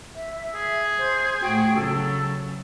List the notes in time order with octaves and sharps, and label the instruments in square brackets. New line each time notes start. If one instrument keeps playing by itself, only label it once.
[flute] E5
[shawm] G#4
[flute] C5
[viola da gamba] A2 F#4 [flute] G5
[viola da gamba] C#3 F#3 [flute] A4